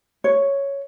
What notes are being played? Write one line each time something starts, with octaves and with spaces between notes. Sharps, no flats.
C#5